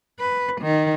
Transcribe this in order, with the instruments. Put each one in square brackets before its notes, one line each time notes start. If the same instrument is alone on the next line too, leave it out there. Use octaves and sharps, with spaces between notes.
[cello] B4
D#3